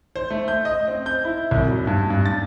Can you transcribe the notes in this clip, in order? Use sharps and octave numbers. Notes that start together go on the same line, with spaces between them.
C5
A3
G6
D#5
C4
G6
E4
C2
F#3
G2
G2
A6